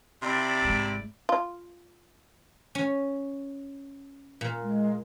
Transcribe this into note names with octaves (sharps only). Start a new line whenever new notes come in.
C3 E4 D5
G#1 G#3
F4
C#4
A#2
G#3